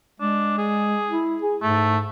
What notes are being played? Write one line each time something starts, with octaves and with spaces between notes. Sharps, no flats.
G#3 D4
G#4
E4
G#4
G#2 A3